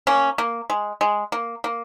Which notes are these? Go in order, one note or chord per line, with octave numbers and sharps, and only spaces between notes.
A#3 C#4
A#3
G#3
G#3
A#3
A#3